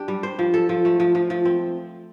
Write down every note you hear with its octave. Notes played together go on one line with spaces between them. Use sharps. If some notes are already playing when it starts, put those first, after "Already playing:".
Already playing: D4 G4
G3
C5
F3
A4
F3
A3
F3
F3
F3
C4